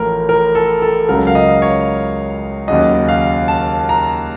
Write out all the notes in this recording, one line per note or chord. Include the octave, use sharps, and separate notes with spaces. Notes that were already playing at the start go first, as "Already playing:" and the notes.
Already playing: A1 A2 F3 A#4
A#4
A4
A4
C#2 C#3 F#3 A#4
F5
D#5
C#5
D#2 C#3 F#3 D#5
F5
A5
A#5